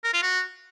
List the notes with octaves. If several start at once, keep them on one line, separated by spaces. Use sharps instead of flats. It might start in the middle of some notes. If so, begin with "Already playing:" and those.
A#4
F4
F#4